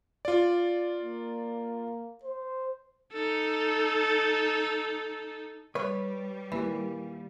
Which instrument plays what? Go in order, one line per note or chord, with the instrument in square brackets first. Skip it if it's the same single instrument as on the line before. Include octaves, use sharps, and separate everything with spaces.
[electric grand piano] F4 D5
[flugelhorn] A#3
C5
[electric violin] D#4 A4
[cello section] G3 [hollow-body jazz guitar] B4 C#5
[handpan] D#3 A#3 G4 [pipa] E3